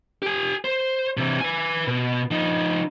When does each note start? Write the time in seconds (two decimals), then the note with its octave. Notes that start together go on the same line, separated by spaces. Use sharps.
0.22 G4 G#5
0.64 C5
1.17 C3 E3
1.40 B4 G#5
1.87 B2
2.31 F3 D#4